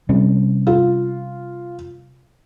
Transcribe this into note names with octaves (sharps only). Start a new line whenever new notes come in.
C3 G3 C#4
F4